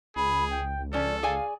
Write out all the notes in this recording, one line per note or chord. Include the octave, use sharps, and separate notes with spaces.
C#2 G#4 B5
G5
F3 C#4 A4 D5
G#4 D5 F5 G#5